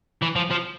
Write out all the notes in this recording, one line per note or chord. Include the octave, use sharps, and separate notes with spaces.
E3
F3
F3